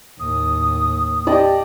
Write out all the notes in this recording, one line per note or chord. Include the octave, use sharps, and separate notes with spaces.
D#2 A2 D#6
G4 D5 D#5 A5